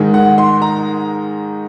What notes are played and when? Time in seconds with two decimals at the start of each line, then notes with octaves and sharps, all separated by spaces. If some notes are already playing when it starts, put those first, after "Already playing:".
Already playing: G#2 D#3 G#3
0.14 F#5
0.38 C6
0.62 A#5